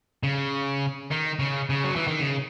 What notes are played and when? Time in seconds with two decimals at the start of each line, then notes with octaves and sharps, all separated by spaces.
0.23 C#3
1.11 D#3
1.39 C#3
1.70 C#3
1.84 F#3
1.96 E3
2.08 D#3
2.20 C#3